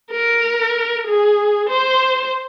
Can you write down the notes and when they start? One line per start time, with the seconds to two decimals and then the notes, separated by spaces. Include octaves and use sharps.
0.11 A#4
1.07 G#4
1.69 C5